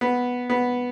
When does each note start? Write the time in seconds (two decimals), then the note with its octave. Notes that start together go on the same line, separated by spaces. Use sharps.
0.01 B3
0.50 B3